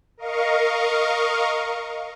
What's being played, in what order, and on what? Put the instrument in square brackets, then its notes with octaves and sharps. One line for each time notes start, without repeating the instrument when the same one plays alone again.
[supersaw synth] A#4 D#5 F5 C#6